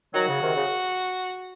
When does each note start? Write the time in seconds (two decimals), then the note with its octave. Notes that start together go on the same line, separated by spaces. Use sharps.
0.14 D#3 F#3 F#4
0.28 C#3
0.42 C3 D#3
0.55 C#3